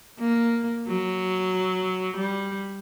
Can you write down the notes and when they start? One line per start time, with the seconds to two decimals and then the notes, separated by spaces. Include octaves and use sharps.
0.19 A#3
0.87 F#3
2.17 G3